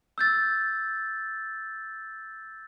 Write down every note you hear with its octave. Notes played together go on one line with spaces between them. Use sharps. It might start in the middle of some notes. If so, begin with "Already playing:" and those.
E6 G6 A6